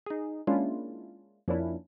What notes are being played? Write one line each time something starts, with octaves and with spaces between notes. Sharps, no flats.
D#4 G#4
G#3 A#3 C#4 D4 E4 F4
F2 F3 A#3 C#4 D4 E4